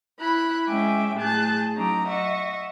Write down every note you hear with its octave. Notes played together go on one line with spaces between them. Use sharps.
E4 B5 F#6
G#3 C#4 E5 G5 G#5 D6
A2 G#4 A5 F#6 G6 A6
F#3 C#4 D#4 A#5 D6
D#5 E5 F#5 C#6